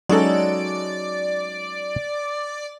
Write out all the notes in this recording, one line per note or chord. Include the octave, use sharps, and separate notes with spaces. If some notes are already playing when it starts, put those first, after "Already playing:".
F#3 G#3 C#4 D#4 F#4 A4 D5